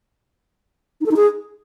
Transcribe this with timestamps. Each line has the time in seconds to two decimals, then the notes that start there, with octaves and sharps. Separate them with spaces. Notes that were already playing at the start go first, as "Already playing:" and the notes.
1.01 D#4
1.06 A4
1.11 D#4
1.16 G#4